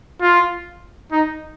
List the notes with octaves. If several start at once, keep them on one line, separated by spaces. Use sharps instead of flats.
F4
D#4